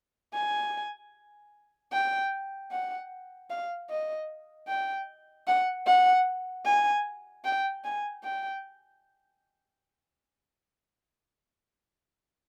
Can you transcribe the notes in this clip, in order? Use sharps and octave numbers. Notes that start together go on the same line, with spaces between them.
G#5
G5
F#5
F5
D#5
G5
F#5
F#5
G#5
G5
G#5
G5